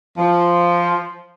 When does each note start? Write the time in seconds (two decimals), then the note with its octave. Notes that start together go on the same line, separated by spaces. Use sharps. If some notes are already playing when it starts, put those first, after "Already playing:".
0.18 F3